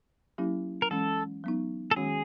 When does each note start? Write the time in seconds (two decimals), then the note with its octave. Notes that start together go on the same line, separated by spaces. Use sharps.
0.38 F#3 A#3 C#4 E4 G4
0.82 A#4
0.91 E3 G#3 C#4 A4
1.44 F#3 B3 D#4
1.91 A4
1.96 D#3 G#3 C#4 F#4 G#4